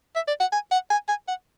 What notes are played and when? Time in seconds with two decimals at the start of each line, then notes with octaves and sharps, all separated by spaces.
0.16 E5
0.27 D5
0.40 F#5
0.52 G#5
0.71 F#5
0.90 G#5
1.08 G#5
1.28 F#5